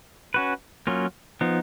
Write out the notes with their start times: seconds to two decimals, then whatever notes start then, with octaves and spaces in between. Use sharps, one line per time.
0.34 C#4 F#4 B4
0.87 F#3 A#3 C#4 F4
1.41 F3 B3 D#4